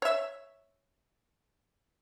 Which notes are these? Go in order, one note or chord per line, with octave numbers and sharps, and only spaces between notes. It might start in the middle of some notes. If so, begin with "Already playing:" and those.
C#5 E5